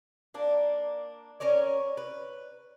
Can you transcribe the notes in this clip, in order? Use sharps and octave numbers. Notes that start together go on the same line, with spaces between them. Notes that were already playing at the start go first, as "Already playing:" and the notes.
A#3 D4
C#4 A#4 C#5 D5
B4